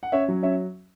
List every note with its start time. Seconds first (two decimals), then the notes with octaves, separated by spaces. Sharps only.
0.03 F#5
0.12 C#4 C#5 E5
0.28 F#3
0.43 C#4 C#5 E5